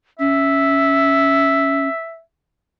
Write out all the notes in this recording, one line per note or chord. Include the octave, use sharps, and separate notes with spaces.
C#4 E5